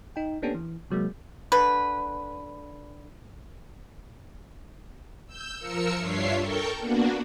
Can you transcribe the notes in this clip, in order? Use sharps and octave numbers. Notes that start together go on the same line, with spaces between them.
D#4 G5
A#3 B3 C#4 D4 G4 A4
E3
C3 F#3 G#3 A#3
D3 B4
E6 G6
F3 A#4 E6 C#7
G2 D4 F4 C#5 E5 C7
A4 A#4 G5 C#6 G6
A#3 B3 D4 F#4